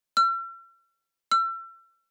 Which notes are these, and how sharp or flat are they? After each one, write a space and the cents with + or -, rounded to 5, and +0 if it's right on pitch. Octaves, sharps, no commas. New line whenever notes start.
E6 +45
E6 +35